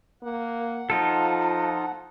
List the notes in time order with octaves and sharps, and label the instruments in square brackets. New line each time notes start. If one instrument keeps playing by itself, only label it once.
[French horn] A#3 [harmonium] F#5
[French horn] F3 [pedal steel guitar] D#4 F4 A4 [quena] A5